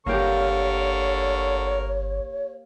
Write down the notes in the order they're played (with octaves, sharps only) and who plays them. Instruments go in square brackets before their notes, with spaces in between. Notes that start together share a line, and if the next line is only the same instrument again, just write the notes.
[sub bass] G1 [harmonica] D3 A#4 C#6 [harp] A#3 G4 [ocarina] C#5